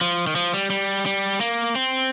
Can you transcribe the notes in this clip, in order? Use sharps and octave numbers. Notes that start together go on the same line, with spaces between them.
F3
D#3
F3
G3
G3
G3
A#3
C4